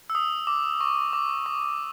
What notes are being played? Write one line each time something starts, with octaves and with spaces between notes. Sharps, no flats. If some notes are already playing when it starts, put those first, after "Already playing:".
E6
D#6
D6
C#6
D6
C#6